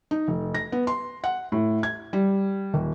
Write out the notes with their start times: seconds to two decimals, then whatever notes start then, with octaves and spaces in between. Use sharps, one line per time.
0.11 D#4
0.28 F1
0.54 A#6
0.72 B3
0.87 C6
1.24 F#5
1.52 A2
1.83 G#6
2.13 G3
2.74 D#1